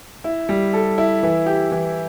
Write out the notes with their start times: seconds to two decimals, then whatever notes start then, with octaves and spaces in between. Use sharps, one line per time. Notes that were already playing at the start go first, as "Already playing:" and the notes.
0.24 E4
0.49 G3
0.73 A4
0.98 E4
1.23 E3
1.46 G4
1.71 E3